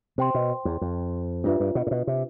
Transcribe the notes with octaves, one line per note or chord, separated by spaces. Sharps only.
C3 C5 G5 C6
B2
E2
F2
G2 D4 F4 B4 E5
G2
B2
A2
B2
C3